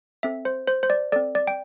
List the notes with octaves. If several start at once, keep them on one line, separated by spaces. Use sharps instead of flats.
C4 A4 E5
C5
C5
C5
D5
C4 A4 D5
D5
G5